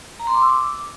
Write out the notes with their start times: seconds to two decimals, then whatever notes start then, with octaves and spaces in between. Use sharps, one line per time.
0.19 A#5
0.27 C6
0.35 D6
0.42 E6
0.50 D6